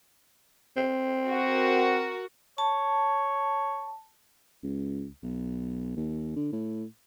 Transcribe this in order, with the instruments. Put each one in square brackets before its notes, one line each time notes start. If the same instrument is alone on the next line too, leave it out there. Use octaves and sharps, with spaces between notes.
[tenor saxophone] C4
[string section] F#4 A#4
[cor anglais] C#5 [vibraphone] A5
[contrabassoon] C#2
B1
D#2
D3
A2